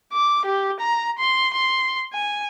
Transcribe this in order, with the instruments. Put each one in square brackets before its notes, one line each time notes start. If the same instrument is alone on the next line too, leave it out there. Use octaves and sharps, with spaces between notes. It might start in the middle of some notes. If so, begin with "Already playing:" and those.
[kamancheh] D6
G4
A#5
C6
C6
G#5